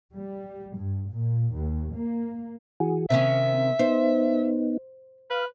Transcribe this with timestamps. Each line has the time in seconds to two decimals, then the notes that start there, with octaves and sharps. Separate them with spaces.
0.14 G3
0.76 G2
1.11 A#2
1.54 D#2
1.95 A#3
2.80 E3 F#4 G#4
3.10 C3 D#3 C4 C#4 E5
3.79 B3 D#4 C5
5.30 B4 F5